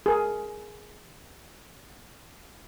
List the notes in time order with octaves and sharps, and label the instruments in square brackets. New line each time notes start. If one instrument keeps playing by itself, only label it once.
[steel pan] G#4 A#4